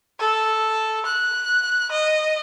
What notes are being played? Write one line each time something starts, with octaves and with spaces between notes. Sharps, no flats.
A4
F#6
D#5